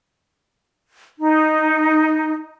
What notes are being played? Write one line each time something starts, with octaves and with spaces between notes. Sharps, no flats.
D#4